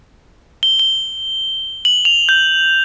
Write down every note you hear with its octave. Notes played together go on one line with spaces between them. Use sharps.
G7
G7
F#7
F7
G6